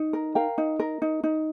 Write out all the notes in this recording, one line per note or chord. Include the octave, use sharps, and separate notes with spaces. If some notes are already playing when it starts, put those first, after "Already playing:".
Already playing: D#4
A#4
A#4 F5 G5
D#4
A#4
D#4
D#4